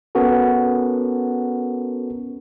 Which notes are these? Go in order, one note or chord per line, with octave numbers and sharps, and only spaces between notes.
B3 C#4 F#4 A4 A#4